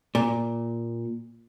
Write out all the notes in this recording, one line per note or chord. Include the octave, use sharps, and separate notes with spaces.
A#2